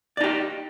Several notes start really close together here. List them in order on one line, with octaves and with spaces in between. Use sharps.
D5 D#4 G4